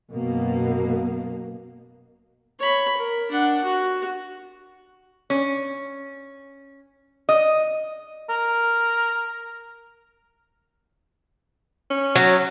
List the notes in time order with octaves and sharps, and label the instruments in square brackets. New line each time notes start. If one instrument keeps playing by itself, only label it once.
[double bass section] F#2 B2 A#3
[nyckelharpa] C#5 B5
A#4
D4 F#5
F#4
[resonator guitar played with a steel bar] C#4
D#5
[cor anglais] A#4
[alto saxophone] C#4
[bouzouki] F#3